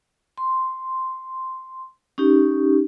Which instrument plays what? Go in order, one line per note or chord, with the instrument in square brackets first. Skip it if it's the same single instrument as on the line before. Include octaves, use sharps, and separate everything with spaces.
[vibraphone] C6
C#4 D#4 G4